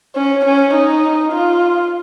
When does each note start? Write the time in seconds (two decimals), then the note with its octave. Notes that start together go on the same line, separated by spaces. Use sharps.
0.15 C#4
0.45 C#4
0.74 D#4
1.32 F4